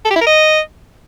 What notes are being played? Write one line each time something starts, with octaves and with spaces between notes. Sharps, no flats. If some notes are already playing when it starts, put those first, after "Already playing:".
A4
G4
E4
A#4
D#5